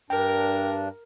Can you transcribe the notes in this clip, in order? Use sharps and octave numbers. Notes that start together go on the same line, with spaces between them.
G2 D4 A#4 G5